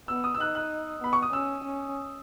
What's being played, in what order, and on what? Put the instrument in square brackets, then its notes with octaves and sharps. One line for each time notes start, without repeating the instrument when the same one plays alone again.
[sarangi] B3 [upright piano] E6
[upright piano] D#6
E6
[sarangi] D#4 [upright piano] F#6
[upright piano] F#6
[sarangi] B3 [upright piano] B5
[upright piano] C#6
D#6
[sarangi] C#4 [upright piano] E6
[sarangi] C#4